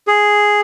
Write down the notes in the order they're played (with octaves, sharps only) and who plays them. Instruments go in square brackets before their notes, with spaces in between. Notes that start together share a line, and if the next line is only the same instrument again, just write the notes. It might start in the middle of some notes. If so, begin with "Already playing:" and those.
[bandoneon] G#4